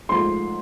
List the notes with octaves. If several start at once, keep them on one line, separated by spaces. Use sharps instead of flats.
G#2 F3 A3 C6